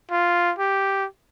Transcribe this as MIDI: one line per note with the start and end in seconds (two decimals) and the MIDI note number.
0.11 0.52 65
0.59 1.05 67